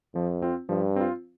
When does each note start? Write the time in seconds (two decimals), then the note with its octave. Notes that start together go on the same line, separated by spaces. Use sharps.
0.15 F2 F3
0.42 C4 F4
0.69 G2 F3
0.96 C4 F4